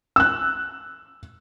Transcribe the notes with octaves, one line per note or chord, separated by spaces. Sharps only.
E6 F#6